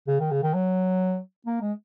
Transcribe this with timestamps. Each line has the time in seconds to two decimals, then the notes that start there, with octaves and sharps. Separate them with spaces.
0.08 C#3
0.20 D#3
0.31 C#3
0.43 D#3
0.54 F#3
1.46 A#3
1.62 G#3